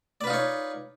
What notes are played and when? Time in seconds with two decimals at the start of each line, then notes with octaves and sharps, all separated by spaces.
0.21 D5
0.24 B4
0.27 F4
0.30 D#4
0.33 C#5